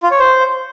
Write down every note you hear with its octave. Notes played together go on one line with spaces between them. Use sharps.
F4
C#5
C5